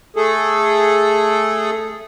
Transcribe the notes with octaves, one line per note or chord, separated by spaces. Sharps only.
A3 G#4 A4